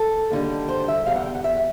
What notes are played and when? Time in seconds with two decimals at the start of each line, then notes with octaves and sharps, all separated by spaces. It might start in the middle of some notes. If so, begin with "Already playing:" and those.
Already playing: A4
0.30 D#2 D3 G3
0.69 C5
0.88 E5
1.06 E2 B2 G3 F5
1.16 F#5
1.26 G5
1.35 F#5
1.44 E5